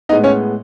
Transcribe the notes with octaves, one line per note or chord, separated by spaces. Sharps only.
A2 G#3 B3 D#4 D#5
C#4 C#5